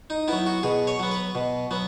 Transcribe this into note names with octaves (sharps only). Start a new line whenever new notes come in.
D#4
F#3 B3 E4
F#4
B2 G#4
C#5
F#3 B3
B4
B2
F#3 B3